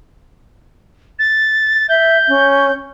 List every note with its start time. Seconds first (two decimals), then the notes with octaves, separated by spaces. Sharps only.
1.19 A6
1.89 E5 G6
2.28 C#4